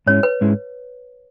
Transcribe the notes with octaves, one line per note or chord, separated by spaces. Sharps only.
G#2 G#3 C#4 E4 C#5
B4
G#2 G#3 C#4 E4